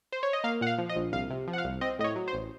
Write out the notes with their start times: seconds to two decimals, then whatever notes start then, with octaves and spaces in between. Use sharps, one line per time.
0.12 C5
0.23 C#5
0.33 D#5
0.44 A#3 F5
0.61 A#2 F#5
0.67 F5
0.78 F3
0.89 D#5
0.96 A#1
1.12 C2 F5
1.30 C3
1.47 F3
1.53 F#5
1.58 F5
1.64 C2
1.81 C4 D#5
1.99 A2 D#5
2.04 C#5
2.16 F#3
2.28 C5
2.33 A1